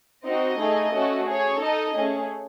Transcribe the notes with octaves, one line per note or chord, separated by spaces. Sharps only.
C4 D#4 F#4 D#5
A3 D#4 G#4
A3 C#4 F#4 A4
C#4 G#4 C#5
D#4 A4 D#5
A3 C#4 G#4